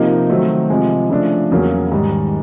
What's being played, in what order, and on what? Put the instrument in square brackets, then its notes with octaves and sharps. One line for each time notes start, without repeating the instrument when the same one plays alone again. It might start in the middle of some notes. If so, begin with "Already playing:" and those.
Already playing: [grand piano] C3 F3 A#3 D#4 G4
D#3 F#3 A3 C4
C3 F3 G#3
C#3 F3 A3 D4
E2 C#3 F#3 A#3 C#4
G#2 D#3 G3